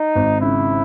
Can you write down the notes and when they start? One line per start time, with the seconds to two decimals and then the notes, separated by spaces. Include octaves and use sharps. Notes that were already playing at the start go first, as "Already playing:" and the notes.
Already playing: D#4
0.15 G#1
0.41 C#3 E4